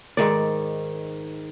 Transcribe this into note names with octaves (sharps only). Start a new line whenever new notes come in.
G#2 D#3 D5